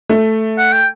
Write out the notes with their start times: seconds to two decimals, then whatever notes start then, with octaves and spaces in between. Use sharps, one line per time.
0.09 A3
0.58 F#5
0.73 G5